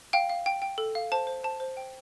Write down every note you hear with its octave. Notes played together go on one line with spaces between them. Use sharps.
F5 G5
F5
G5
G5
A4
F5
C5 A5
C5
C5 A5
C5
G5